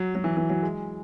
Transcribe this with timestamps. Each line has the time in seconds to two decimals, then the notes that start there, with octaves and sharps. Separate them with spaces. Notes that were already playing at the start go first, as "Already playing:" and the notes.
Already playing: F#3
0.15 F#3
0.24 E3
0.37 E3
0.50 F#3
0.63 G#3